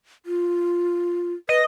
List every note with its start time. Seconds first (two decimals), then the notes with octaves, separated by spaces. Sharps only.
0.26 F4
1.49 B4 D#5